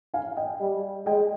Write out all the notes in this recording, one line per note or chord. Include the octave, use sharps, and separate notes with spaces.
F5 G#5
D#5 G5
G3
G#3 D#5 G5